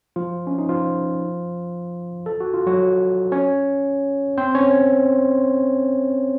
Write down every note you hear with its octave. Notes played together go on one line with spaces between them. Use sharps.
F3 F4
C#4
D#4
F3 F4
A4
F#4
F4
F#3 F#4
C#4 C#5
C4 C5
C#4 C#5